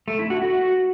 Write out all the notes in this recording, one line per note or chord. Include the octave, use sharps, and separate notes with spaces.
A3
E4
F#4
F#4